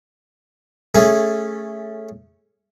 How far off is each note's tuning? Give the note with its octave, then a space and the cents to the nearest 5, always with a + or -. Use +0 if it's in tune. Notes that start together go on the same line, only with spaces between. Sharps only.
A3 +0 C#4 +0 G#4 -15